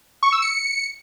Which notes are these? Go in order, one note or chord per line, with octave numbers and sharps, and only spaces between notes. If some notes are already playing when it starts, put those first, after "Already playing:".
C#6
E6
C#7